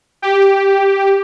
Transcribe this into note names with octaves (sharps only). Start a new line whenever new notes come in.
G4